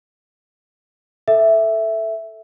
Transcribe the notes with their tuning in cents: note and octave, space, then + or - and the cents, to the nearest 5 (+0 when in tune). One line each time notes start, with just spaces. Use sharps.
A4 +0 E5 +0